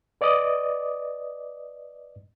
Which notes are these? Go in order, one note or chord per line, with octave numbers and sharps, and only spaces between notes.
B4 D5 D#5 D6 D#6